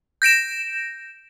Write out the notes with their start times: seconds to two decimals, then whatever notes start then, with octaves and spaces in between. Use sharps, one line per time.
0.22 G6 A#6 D7 E7